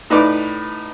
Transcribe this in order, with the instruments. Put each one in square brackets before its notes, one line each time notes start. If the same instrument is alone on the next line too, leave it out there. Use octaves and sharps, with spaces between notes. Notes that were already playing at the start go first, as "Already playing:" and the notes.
[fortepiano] A2 D#4 B4 D5 D6